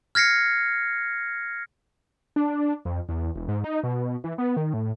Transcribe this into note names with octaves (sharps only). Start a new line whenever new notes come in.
F6 G#6 A#6 C7 C#7
D4
F2
E2
E1
G#2
D#4
B2
E3
B3
D#3
A2